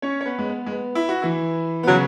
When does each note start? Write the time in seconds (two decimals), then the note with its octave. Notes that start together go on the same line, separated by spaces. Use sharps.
0.02 C#4 C#5
0.21 C#5
0.25 B3 B4
0.39 G#3
0.49 B3
0.66 G#3
0.72 B3
0.95 E4
1.09 F#4
1.22 E3 E4
1.83 B3
1.87 C#3 F#3 C#4